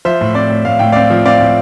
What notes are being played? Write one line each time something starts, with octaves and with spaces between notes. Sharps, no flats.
F3 C5 E5
A2
C4 D5
A2
A2 F5
A2 G5
C4 D5 F5
F3
C4 D5 F5
A2